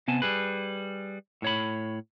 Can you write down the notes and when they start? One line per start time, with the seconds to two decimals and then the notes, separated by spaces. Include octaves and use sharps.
0.08 C3 B3 G#5 A5
0.22 G3 G#4 B4
1.42 A2 C#5 B5